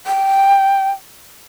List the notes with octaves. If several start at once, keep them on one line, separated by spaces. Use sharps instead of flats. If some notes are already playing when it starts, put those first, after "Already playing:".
G5